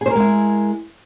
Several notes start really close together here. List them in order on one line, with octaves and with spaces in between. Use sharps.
G#4 C5 A#4 G#3 E4